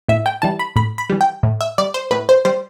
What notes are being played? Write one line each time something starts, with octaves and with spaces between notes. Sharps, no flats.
A2 E5
G5
E3 G3 A5
B5
A2 B5
B5
E3 G3
G5
A2
E5
G3 D5
C5
A2 B4
C5
G3 C5